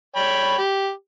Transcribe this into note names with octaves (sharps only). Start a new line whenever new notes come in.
C#5 G5 B5
G4